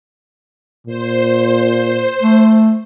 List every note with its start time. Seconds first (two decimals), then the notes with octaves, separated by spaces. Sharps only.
0.87 A#2 C5
2.22 A3